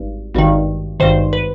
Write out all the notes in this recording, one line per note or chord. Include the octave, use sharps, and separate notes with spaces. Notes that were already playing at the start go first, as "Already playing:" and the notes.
Already playing: G#1 G2
G#1 G2 D#3
G#1 G2 D#3 C5
B4